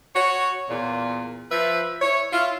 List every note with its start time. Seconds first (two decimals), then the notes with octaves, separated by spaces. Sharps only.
0.15 F#4 C#5
0.69 E2 A#2
1.51 F3 B4 E5
2.01 E4 C#5
2.33 E4 F4